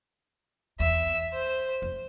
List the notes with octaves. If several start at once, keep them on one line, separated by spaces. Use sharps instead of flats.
E2 E5
C5
F2